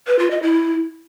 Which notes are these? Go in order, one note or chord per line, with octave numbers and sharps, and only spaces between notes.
B4
F4
D#5
E4